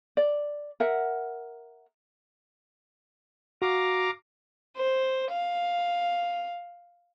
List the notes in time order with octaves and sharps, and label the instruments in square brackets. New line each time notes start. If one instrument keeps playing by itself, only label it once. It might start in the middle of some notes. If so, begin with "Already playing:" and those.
[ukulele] D5
A#4 E5 F#5
[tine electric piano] F#4 [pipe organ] F5 A#5 D6
[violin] C5
F5